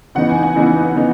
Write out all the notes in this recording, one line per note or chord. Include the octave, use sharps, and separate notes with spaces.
C#3 E3 B3 D#4 F#5
G#5
F#5
C#3 E3 B3 D#4
C#3 E3 B3 D#4